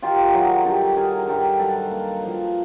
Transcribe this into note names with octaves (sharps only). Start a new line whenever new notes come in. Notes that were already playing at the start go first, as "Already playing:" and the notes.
D#3 F4 G4
F#3 F#4 G#4
G2 G4 A4
F#3 G#4 A#4
A#4
G2 G4 A4
F#3 A4 B4
A#3
F3